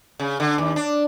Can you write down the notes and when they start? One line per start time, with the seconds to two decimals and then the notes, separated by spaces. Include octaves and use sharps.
0.20 C#3
0.40 D3
0.58 D#2
0.76 D4